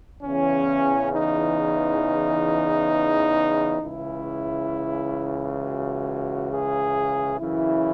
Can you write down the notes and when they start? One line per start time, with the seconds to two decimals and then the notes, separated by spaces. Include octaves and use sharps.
0.22 E2 C#3 E3 C#4
1.12 D#4
3.81 C#2 C#3 E3 E4
5.60 F#4
6.50 G#4
7.39 F#2 C#3 E3 E4